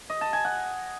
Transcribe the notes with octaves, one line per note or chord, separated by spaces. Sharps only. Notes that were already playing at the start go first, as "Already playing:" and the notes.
D#5
A5
G#5
F#5